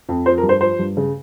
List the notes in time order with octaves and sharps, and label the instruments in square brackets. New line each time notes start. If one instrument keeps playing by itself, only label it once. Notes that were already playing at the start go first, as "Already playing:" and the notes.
[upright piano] F2
F3 C5
A#4
G2
C5
F3 C5
G2
C#3